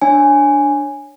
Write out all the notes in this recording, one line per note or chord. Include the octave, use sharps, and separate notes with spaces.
D4 C#5 G#5